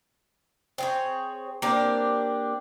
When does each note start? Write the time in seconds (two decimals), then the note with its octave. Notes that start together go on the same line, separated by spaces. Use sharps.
0.78 C4 G#4 C#5
1.62 A#3 C4 D4 G4